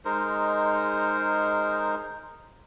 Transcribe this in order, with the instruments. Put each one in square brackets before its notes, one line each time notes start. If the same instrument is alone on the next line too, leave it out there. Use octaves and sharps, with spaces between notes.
[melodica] G#3 D#4 A#4 C5